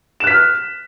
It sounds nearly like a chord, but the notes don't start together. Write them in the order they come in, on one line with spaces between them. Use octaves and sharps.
E7 F#6 B6 F6